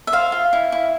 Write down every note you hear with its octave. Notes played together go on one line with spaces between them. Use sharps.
E5
C5 F5
F4
E4
E4